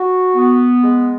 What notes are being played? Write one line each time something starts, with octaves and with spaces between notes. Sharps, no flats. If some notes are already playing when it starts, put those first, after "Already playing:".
Already playing: F#4
B3
G#3